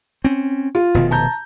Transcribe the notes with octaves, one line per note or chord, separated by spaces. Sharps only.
C4 C#4
F4
F1 B2 D#3
A5 A#5 G6